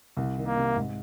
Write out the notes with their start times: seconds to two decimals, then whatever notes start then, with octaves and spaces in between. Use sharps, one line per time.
0.17 C2
0.37 D#3
0.46 A#3
0.56 C3
0.76 G#2